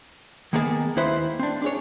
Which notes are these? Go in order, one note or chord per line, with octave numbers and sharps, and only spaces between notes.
D#3 A#3 B3 G#4 D5 A5
D#2 E4 B4 C5
C4 D4
D4 G#4 C#5